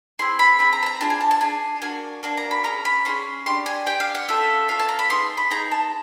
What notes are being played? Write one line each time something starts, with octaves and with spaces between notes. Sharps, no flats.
C4 E4 G#4 C6
B5
C4 E4 B5
G#4
A#5
A5
A#5
D4 F4 G#4 A5
G#5
A5
A5
D4 F4 G#4 G#5
A#3 D4 F#4 G#5
A#3 D4 F#4 A5
A#5
B5
C#4 F4 G#4 A#5
B5
C#4 F4 G#4 C6
D4 G4 C6
G#5
D4 G4 G5
F5
F#5
C#4 F4 A4 E5
C#4 F4 A4 F5
A5
A#5
B5
B3 D#4 G#4 C6
B5
B3 D#4 G#4 A#5
A5